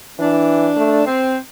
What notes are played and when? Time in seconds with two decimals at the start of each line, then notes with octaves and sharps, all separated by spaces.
0.19 E3 D4
0.77 A3
1.06 C4